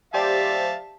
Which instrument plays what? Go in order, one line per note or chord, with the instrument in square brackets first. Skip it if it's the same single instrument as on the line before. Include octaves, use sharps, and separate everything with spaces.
[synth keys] G4 C5 D5 [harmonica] E5 F5 A5